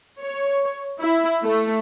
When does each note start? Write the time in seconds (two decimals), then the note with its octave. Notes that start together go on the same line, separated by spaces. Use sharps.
0.22 C#5
1.00 E4
1.43 A3